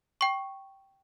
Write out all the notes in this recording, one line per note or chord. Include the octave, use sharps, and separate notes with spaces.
G5 C#6